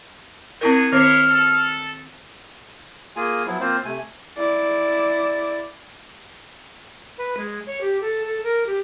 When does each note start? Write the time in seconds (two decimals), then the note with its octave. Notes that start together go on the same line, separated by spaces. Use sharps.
0.61 B3 C4 D#4 E4 G#4 A#4
0.92 D#3 C4 E4 C5 C#5 C6 F6
1.27 A4
3.16 A#3 F4 G#4 G#5
3.46 F3 F#3 B3 E4
3.60 A#3 C4 F4 C5
3.85 C3 A3 G#5
4.37 E4 D5
7.18 B4
7.37 G#3
7.67 C#5
7.81 G4
8.01 A4
8.24 A4
8.44 A#4
8.67 G4